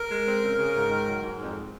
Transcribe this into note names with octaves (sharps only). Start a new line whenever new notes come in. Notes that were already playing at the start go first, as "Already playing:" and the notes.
Already playing: A#4
G#3
C4
C#3
C#3
G#2
D#3
F#3
G#2
F2